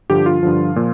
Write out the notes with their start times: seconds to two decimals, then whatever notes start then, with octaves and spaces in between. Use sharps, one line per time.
0.09 G2 D3 F3 G4
0.26 F4
0.43 G2 D3 F3
0.76 A#2 F3